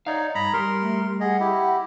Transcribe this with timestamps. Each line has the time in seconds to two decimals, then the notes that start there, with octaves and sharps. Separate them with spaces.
0.06 D#4 C#5 D5 F5 G#6
0.35 G2 A#5 B5 D#6
0.54 G3 A#4 C6
0.81 A3
1.20 G#4 D#5 F#5
1.40 E4 G4